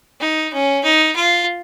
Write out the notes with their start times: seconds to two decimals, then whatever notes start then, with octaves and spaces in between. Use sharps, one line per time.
0.21 D#4
0.53 C#4
0.84 D#4
1.16 F4